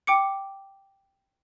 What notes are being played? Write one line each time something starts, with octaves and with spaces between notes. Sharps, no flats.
G5 D6 C#7